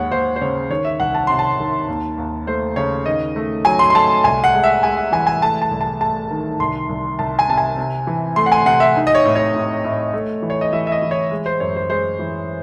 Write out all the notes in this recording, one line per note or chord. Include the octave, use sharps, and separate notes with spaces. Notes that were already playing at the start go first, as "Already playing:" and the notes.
Already playing: D#2 G#3 C#5 F#5
D#2 C5
C5
C#3 C#5
D#3 C#5
E5
C2 F#5
A5
C3 C6
A5
D#3
D#2
D#2
A3 C5
C#3 C#5
D#3 D#5
A3
F#3 G#5
C6
C6
A3 A5
C2 G#5
F#5
G#3
E5
G#3 G#5
F#5
E3 G#5
G#5
A3 A5
A5
C2
A5
A3 A5
D#3
C2 C6
C2
C2 A5
G#5
C3 A5
G#5
C3
E3
A3 C6
F#5
G#5
C3 F#5
E5
D#4
D#5
C#5
A2
C#5
A2
A2
A3
E3
C#5
D#5
E3 E5
E5
D#5
E3
C#5
G#3
C5
F#2 C#5
C5
G#3 C5
E3